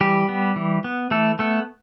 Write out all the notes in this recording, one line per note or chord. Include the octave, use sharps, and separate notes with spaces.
E3 G3 G4
B3
E3
B3
E3 A3 A4
A3 B3 A4